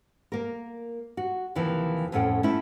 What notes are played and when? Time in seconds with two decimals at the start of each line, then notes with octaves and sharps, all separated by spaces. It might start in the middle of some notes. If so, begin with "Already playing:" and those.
0.32 A#3 A#4
1.17 F#4
1.55 D#2 C3 E3 F3
2.12 F2 A2 C#4 A4 F#5 G5
2.43 A3 C#4 E4